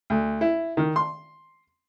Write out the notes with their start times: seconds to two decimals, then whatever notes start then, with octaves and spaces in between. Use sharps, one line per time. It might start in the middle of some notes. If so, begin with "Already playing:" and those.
0.10 D2
0.41 E4
0.77 D#3
0.96 C6